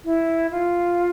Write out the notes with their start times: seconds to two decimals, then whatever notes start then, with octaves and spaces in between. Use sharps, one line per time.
0.05 E4
0.51 F4